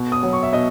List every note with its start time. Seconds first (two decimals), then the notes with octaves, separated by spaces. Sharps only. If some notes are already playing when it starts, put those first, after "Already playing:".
Already playing: B2
0.12 D#6
0.23 F#3
0.33 C#6
0.43 E5
0.52 B2 D#5